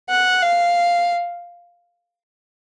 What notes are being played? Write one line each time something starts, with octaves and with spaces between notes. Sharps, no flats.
F#5
F5